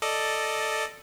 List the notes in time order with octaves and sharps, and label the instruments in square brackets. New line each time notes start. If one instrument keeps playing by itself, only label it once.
[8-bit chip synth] A4 D5 D#5